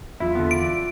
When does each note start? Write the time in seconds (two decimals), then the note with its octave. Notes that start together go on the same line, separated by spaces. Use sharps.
0.20 E2 F#3 E4 F4 E5
0.35 D3 B3
0.51 D5 D7